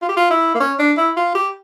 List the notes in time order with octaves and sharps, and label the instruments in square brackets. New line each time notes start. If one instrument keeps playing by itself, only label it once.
[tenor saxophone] F4
G4
F4
E4
A#3
C#4
D4
E4
F4
G4